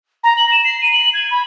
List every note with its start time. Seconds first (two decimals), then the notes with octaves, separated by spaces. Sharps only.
0.24 A#5
0.37 F#7
0.52 E7
0.65 C7
0.82 D#7
0.93 F#7
1.13 G#6
1.31 B5